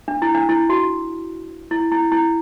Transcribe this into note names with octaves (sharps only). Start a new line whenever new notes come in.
D4
E4
D4
E4
F#4
E4
E4
E4